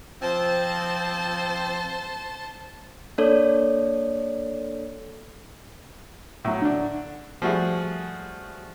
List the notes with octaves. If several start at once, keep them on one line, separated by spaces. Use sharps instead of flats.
F3 C4 C5 A5
A#3 D4 A4 C#5 D5
A2 F#3
D3 D4
F3 G3 A3 F#4 G#4